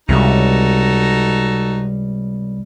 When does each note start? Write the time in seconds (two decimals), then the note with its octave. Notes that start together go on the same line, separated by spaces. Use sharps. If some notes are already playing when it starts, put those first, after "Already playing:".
0.09 C#2 C3 G3 D#4 F#4 A4